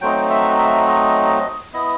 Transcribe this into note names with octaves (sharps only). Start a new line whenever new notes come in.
F#3 A3 C4 D#4 G5
E5
E5
D#5
B3 E4 D#5